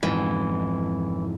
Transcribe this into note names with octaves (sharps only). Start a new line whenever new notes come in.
F2 G#2 E3